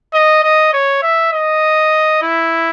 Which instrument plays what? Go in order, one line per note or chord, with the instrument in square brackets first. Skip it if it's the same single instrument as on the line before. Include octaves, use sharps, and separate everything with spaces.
[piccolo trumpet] D#5
D#5
C#5
E5
D#5
E4